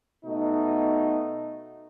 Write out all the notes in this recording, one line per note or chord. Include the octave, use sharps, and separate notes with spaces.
B2 A3 D#4 F#4